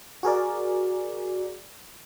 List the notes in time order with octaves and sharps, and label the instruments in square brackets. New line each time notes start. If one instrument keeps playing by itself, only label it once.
[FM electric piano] F#4 G#4 A#4 D5